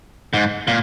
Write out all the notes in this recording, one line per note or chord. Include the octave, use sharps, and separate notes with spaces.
G#2
A#2